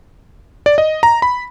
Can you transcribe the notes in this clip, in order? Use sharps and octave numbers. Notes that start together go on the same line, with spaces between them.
D5
D#5
A#5
B5